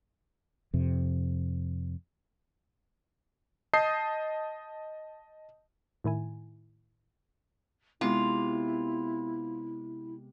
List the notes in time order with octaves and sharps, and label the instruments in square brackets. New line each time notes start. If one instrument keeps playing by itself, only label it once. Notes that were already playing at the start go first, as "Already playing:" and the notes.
[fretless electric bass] F2 C3
[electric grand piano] D#5 A5 D#6 G6 C7
[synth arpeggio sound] A2 D#3 E4 G#5
[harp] C3 G#3 B3 [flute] E4 [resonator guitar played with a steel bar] F4